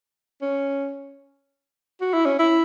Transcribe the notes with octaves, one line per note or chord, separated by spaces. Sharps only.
C#4
F#4
E4
C#4
E4